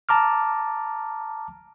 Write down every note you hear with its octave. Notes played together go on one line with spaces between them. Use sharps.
A5 A#5 D6 F6